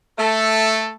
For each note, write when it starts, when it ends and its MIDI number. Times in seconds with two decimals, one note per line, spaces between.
0.18 0.93 57
0.18 0.93 69